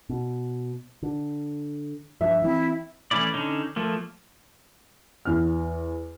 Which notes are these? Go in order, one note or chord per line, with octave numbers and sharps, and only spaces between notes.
B2
D3
G2 F3 E5
E3 A#3 C4 E4
E3 A3 C#4 E4 D5
D3 C#4 D#4
F3 A3 A#3
E2 F6